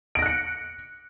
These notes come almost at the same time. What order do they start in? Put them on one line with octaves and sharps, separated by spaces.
D7 A#6 F#6 C#7